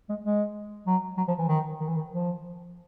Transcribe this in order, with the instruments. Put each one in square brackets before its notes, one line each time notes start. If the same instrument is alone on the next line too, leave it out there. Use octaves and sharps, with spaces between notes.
[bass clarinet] G#3
G#3
F#3
F#3
F3
E3
D#3
D#3
E3
D#3
F3